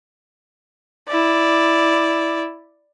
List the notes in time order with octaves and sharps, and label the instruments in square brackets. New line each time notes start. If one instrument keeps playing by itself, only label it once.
[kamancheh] E4 D5